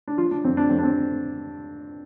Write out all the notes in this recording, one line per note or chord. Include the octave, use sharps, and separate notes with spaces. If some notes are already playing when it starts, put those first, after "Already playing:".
D4
F3 F4
D4
F2 C4
D4
F2 C4
D4
C4